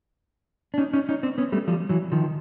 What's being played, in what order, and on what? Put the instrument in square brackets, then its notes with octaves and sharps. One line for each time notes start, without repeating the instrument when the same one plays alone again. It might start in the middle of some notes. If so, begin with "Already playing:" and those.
[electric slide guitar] D4
C#4 D#4
C#4 D#4
C#4 D#4
C4 D4
B3 C#4
G3 A3
F3 G3
E3 F#3
D#3 F3